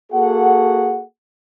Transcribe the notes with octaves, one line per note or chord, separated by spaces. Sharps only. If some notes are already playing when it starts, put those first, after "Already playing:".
A#3 F#4 G#4 A4 F#5